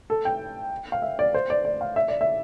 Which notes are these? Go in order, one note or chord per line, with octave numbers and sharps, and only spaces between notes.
A4
G5
F5
E5
D5
C5
D5
D5
F5
E5
D5
E5